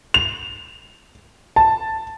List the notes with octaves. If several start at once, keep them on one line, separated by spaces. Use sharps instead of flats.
F7
A5